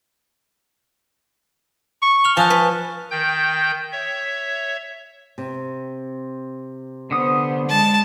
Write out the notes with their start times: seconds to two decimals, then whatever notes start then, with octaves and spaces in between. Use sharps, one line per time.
2.02 C#6
2.24 F6 F7 G7
2.37 F3 G#5 A5 C#6 D#6 F#6
2.50 B4
3.11 D#3 G5 G6
3.92 C#5 E5
5.38 C3
7.11 D3 B3 C5 D#6
7.69 G#3 A5